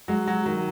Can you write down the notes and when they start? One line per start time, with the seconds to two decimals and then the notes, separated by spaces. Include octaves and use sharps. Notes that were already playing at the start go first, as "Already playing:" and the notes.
0.08 F#3 G#3
0.27 F#3
0.45 D#3 F#3